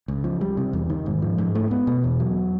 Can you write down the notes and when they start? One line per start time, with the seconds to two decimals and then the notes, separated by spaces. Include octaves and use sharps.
0.08 C#2
0.24 F3
0.41 G3
0.57 C3
0.73 E2
0.90 D#3
1.06 G#2
1.22 F3
1.38 G#2
1.55 A3
1.71 B3
1.87 B2
2.04 E2
2.20 F#3